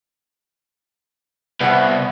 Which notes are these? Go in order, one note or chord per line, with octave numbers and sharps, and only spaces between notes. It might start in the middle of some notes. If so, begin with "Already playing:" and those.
C2 B3 F#5